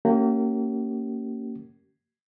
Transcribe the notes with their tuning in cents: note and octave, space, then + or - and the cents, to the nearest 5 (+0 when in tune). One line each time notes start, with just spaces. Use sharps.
A#3 -25 C#4 +0 G4 -45